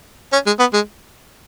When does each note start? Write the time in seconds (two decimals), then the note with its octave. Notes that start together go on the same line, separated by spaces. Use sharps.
0.32 C#4
0.46 G#3
0.59 B3
0.73 G#3